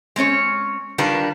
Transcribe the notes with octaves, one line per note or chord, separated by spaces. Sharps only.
G#3 C4 C#4 C#5
D#3 G3 D4 F4 A#4 B4